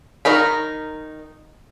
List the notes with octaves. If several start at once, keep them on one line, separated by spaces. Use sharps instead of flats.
D#3 D#4 A#4 B5